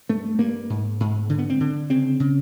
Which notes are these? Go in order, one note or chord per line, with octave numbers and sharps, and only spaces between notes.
G2 A3
G2 A#3
G#2
G#2
D3
B3
C4
D3
C#3 C4
C#3